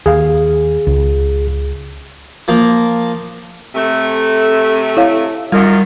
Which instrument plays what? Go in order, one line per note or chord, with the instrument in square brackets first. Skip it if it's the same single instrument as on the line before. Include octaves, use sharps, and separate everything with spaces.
[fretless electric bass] D#2 [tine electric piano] G#4 F5
[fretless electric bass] C#2
[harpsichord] F3 A#3
[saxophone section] C3 A3
[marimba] E4 C#5 F5
[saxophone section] F#2 D#3 F4 [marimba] G3